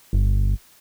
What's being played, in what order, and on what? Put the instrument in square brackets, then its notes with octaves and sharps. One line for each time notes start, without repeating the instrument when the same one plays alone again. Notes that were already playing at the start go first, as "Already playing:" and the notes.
[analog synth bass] G1